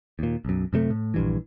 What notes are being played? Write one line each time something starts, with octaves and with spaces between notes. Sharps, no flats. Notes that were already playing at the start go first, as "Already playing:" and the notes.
D#2 A#2
B1 F#2
F#2 C3 F#3 A3
A2
A#1 G2 E3